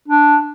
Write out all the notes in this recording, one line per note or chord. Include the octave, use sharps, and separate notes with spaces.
D4